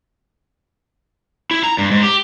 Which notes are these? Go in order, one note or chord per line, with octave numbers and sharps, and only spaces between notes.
E4
A#5
G2
G#2
G4